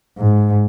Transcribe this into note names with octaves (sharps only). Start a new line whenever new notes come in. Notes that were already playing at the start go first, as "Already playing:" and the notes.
G#2